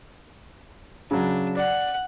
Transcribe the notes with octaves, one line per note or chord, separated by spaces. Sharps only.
C#3 F#3 D4
D5 F#5